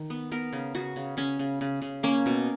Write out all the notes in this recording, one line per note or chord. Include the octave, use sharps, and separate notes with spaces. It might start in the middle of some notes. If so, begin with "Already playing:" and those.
Already playing: D#3
B3
B3 A#4
C#3
C#3 F#4
C#3
C#3 C#4
C#3
C#3
C#3
A#3 C#4
B2